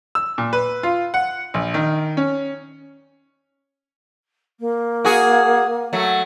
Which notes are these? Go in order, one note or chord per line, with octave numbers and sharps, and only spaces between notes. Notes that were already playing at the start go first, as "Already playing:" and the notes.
E6
A#2
B4
F4
F#5
A#1
D#3
C#4
A#3
F#4 G#4
F#3 A3